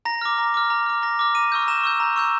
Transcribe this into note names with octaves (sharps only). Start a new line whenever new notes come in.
A#5 A#6
D6 F6
A#5
D6 F6
A#5
D6 F6
A#5 A#6
D6 F6
A#5 D#7
C#6 E6 G6
A#5 E7
C#6 E6 G6
A#5
C#6 E6 G6